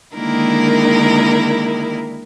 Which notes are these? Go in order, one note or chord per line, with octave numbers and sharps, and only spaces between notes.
D3 D#3 G#3 A#3 E4 A#4